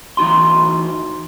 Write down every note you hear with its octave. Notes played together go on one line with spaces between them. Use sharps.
E3 D#4 F#4 C6